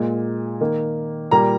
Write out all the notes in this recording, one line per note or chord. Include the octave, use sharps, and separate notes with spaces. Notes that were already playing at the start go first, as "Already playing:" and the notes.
Already playing: A#2 G#3
D#3 A#3
A#2 G3 A#3 A#5